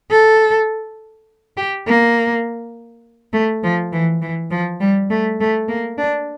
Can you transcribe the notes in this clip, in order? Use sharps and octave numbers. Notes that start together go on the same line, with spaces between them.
A4
G4
A#3
A3
F3
E3
E3
F3
G3
A3
A3
A#3
D4